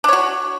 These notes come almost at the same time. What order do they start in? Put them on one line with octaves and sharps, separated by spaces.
D4 C#5 F#4